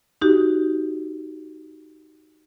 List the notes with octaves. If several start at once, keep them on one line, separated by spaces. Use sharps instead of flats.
D#4 F#4 G4